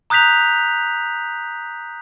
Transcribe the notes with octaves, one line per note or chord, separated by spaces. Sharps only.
A#5 D#6 F#6 G6 B6 F7